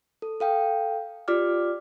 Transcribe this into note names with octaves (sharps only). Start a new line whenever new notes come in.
A4
A4 F5 G5
F4 G4 D5 D6 F6